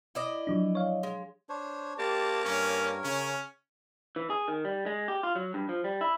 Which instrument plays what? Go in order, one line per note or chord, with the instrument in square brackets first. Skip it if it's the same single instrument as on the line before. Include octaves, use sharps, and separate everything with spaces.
[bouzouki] E4 D5 D#5
[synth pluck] F3 F#3 D4
C#5 F5
[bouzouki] G#3
[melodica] D4 C5 C#5
[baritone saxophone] A#3 [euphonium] G4 [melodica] C5 D5 [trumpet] A5
[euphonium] G2 [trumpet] C#4 [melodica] A#4 C#5
[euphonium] C#3 [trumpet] C#4
[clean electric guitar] E3
G#4
D#3
G3
G#3
G4
F4
F#3
G2
F3
G3
E4